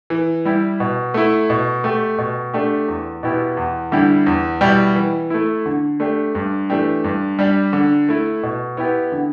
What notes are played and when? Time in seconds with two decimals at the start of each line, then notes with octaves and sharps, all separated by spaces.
0.10 E3
0.45 G3 E4 G4
0.80 B2
1.14 A3 E4
1.50 B2
1.84 A3 G4
2.18 B2
2.54 A3 D4 G4
2.88 E2
3.23 B2 B3 E4 G4
3.57 E2
3.92 D3 G3 E4 G4
4.27 E2
4.61 B2 G3 E4 G4
4.96 E3
5.30 A3 E4
5.66 D3
6.00 A3 D4 G4
6.35 G2
6.70 E3 A3 D4 G4
7.04 G2
7.39 G3 D4 G4
7.73 D3
8.09 A3 E4
8.43 B2
8.77 B3 E4 G4
9.12 D3